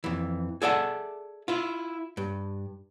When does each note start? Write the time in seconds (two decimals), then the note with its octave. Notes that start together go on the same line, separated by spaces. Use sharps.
0.04 F2 E3
0.62 G#4 A4 D5 E5 F#5 A5
1.48 E4 F4
2.17 G2